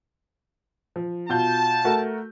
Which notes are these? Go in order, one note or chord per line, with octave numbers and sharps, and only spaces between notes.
F3
B2 F4 A5 G6
A3 F#4 A#4